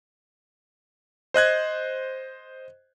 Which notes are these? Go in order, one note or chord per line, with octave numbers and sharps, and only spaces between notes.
C5 D#5 F#6 G#6